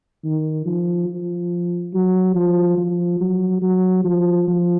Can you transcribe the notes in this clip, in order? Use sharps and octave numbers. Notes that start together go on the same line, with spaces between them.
D#3
F3
F3
F#3
F3
F3
F#3
F#3
F3
F3